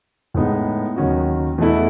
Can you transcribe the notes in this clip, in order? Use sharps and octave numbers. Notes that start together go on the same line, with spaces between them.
A2 G#3 B3 D#4
D#2 D#3 F#3 C#4 F#4
E2 B2 A3 E4